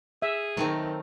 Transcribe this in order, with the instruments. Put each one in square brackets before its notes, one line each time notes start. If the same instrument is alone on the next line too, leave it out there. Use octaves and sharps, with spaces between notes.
[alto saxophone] G#4 [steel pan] E5
[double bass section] D#3 [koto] F#3 A3 C4